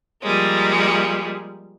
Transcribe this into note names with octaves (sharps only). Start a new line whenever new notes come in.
F3 G3 G#3 A#3